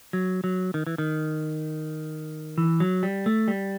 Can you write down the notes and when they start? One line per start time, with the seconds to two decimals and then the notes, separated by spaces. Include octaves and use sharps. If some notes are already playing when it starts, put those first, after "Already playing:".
0.13 F#3
0.44 F#3
0.74 D#3
0.87 E3
0.98 D#3
2.58 E3
2.80 F#3
3.03 G3
3.26 A3
3.48 G3